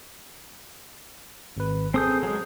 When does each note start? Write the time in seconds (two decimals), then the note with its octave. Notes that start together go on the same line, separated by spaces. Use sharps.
1.57 G#1 B4
1.94 C4 G#4 A4 D#6 G6
2.23 F#3 G#3